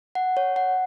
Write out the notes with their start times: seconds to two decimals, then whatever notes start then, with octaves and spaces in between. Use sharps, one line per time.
0.15 F#5
0.37 C#5
0.56 F#5